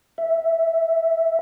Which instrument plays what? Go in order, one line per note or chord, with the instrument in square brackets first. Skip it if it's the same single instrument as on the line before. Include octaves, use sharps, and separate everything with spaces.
[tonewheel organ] E5